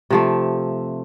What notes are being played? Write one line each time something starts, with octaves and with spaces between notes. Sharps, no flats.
C3 F3 A3